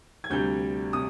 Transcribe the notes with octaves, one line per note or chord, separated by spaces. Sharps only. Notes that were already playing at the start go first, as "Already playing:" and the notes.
G#6
D2 C3 G3 G6
C3 D#6